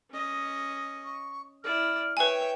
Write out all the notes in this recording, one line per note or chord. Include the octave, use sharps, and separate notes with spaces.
C#4 D#5
C#6
E4 D5 F6
B4 C#5 E5 G5 G#5